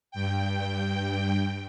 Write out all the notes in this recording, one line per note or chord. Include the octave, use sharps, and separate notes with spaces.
G2 G5